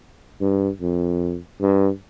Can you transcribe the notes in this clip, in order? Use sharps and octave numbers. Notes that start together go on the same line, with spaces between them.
G2
F2
G2